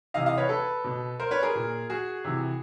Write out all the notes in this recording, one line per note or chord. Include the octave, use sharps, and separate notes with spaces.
C3 E3 D#5 F5
D#5 F5
B4 C#5
A4 B4
B2
A#4 C5
B4 C#5
G#4 A#4
A#2
F#4 G#4
C3 E3